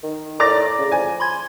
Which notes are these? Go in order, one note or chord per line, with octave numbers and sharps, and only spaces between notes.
D#3
A2 D5 A#5 D6 A6 A#6
C#3
F3 G#5
B5 C6 G#6